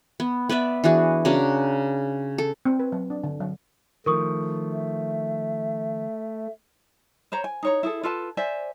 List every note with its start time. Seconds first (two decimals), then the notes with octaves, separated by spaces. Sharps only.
0.20 B3
0.49 B3 B4 D5 E5
0.84 E3 D4 F#4 G#4
1.25 C#3 D4 F#4 A#4
2.38 A4
2.65 C4
2.79 B4
2.92 F#3
3.10 D4
3.24 D3
3.40 F#3
4.06 D#3 F3 A3 A#4 C#6 D#6
4.73 E5
7.32 C5 C#5 A#5
7.44 G#5
7.63 D#4 C#5 A#5
7.83 E4 G#4 A4
8.03 F4 A4 B4 A5
8.37 C5 D5 E5 G#5